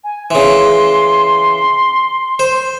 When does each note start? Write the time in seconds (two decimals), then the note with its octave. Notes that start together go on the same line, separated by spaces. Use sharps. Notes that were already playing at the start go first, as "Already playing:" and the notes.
0.04 G#5
0.31 C#3 E3 C6
2.39 C5